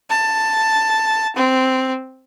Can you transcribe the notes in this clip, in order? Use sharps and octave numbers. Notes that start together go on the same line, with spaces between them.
A5
C4